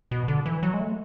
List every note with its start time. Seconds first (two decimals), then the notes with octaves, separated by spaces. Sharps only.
0.11 B2
0.28 D3
0.46 E3
0.63 F#3
0.74 G#3
0.80 A3